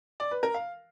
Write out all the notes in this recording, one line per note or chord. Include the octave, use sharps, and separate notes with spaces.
D5
B4
A#4
F5